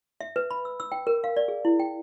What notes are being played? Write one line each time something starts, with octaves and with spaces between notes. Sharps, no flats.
E5
B4
B5
E6
E6
G5
A#4
F5
D5
G#4
E4
G5